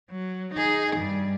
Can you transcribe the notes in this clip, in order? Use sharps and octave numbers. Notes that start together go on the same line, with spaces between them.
F#3
D#4 G#4
G2 G3